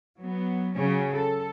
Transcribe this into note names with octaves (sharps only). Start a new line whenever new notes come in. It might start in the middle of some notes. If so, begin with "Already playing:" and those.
F#3 B3
C#3 F#3 C#4
A4